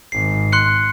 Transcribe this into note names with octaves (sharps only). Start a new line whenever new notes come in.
G#1 C7
C6 F#6 C#7